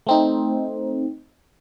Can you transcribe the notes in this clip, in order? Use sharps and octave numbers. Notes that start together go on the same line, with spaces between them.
A3 C4 D#4